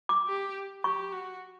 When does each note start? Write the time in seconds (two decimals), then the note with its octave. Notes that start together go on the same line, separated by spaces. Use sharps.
0.09 D6
0.27 G4
0.84 G4 C#6
1.12 F#4